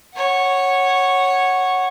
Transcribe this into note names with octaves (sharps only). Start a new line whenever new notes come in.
C#5 F#5